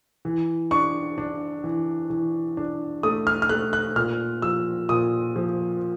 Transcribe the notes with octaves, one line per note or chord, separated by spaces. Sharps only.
E3
D4 C#6
D4
E3
E3
D4
A3 D#6
F6
F6
A3 F#6
F#6
A#2 F6
F3 E6
A#2 D#6
F3